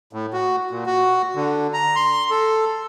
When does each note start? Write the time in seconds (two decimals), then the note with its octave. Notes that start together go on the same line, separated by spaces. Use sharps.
0.13 A2
0.33 F#4
0.71 A#2
0.86 F#4
1.35 D3
1.74 A#5
1.96 C6
2.31 A4